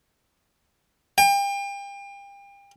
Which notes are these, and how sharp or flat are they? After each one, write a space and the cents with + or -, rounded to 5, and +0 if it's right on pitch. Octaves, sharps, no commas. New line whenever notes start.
G5 +35